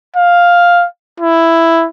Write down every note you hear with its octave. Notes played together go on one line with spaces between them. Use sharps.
F5
E4